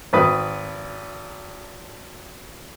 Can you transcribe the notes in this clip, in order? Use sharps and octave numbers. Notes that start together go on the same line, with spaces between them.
G#1 B4 D#6